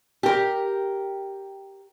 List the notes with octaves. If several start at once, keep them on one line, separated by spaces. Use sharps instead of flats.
G4 A#4